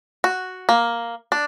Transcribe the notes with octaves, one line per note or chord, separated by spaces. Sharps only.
F#4
A#3
D4